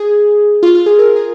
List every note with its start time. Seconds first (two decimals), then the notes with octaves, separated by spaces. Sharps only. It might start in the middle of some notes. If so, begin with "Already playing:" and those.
Already playing: G#4
0.63 F4
0.75 F4
0.86 G#4
0.99 A#4
1.16 G#4